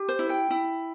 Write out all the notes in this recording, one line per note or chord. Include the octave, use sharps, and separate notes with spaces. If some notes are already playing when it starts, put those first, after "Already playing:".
Already playing: G4
C5
E4
G5
E4